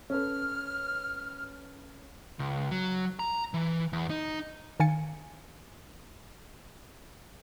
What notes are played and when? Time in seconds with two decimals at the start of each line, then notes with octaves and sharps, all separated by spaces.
0.10 C#4 A4 B4 F6
2.39 C#2
2.71 F#3
3.19 A#5
3.54 E3
3.93 E2
4.10 D#4
4.80 D#3 F5 G#5 A6 C#7